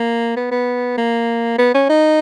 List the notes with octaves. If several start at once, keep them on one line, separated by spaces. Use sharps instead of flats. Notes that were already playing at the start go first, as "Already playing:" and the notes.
Already playing: A#3
B3
B3
A#3
B3
C#4
D#4